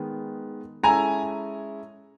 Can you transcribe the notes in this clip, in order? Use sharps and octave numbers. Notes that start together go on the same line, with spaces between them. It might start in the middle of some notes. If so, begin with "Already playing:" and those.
Already playing: D#3 G#3 B3
G#3 C#4 E4 A4 G#5 A#5